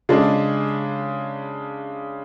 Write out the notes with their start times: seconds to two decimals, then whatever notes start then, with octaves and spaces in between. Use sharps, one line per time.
0.09 C#3 G#3 D4